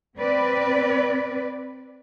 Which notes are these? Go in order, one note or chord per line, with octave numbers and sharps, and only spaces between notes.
C4 B4 D5